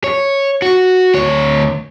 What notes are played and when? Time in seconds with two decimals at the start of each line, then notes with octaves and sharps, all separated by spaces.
0.04 C#5
0.62 F#4
1.14 D2 C#5